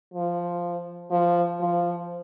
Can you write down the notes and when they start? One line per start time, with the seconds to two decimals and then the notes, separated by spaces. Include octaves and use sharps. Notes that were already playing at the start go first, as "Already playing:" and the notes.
0.14 F3
1.11 F3
1.61 F3